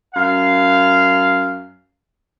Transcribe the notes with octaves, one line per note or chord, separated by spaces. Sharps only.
F#2 F5